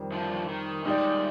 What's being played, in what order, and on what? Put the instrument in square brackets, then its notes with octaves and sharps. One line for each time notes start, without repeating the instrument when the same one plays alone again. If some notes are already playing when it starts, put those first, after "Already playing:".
Already playing: [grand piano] F2 D#3 G3
[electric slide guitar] D3 F3
D#3
[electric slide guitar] D#3 G3 [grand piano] G#3 D#4 G4 D5